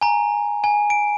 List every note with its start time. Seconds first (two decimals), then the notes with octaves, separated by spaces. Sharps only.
0.01 G#5 A#5
0.64 G#5
0.90 D7